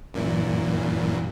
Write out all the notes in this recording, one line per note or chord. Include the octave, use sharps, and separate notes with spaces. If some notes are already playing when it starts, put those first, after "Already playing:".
F#2 A#2 E3